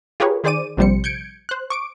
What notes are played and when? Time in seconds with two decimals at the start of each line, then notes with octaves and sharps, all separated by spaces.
0.20 F4 G4 G#4 A#4 B4 C#5
0.44 D#3 G#4 C5 D5 D6 D#7
0.77 A#1 C3 F3 G3 C5 C#7
1.04 G6 G#6 C#7 D7
1.49 C5 F#6
1.70 C#6 D6 D7